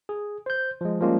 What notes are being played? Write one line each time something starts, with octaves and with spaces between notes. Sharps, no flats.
G#4
C5 G6
F3 G#3
F3 G3 G#3 A#3 C#4 F4